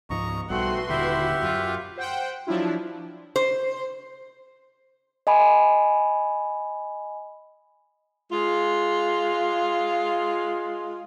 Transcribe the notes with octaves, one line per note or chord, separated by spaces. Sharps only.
C#2 G#2 F3 D#5 A#5 C#6
B1 G3 A3 C4 F#4 B4 F#5 C6
D#1 D3 E4 G4 E5 F#5
F#2 F4
C5 F#5 G5
F3 F#3 D4 E4 F4
C5
D#5 G#5 B5
G#3 F4